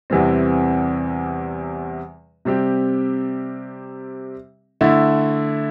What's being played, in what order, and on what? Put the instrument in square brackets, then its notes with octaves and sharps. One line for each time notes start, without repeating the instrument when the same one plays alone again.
[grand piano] E2 C3 E3 G3 C4
C3 G3 C4 G4
D3 A3 E4